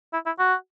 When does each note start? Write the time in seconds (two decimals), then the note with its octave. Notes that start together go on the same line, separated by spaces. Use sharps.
0.13 E4
0.26 E4
0.39 F#4